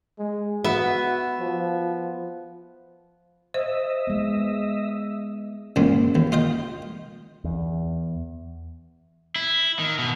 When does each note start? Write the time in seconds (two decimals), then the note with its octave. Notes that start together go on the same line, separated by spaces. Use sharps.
0.19 G#3
0.64 B3 F#4 E5
1.41 F3
3.54 C5 D#5 E5
4.07 G#3 B3
5.76 C#2 F#2 A#2
6.15 D#2
6.32 F4 D#5 G5
7.44 E2
9.36 E4
9.79 D#3
9.99 B2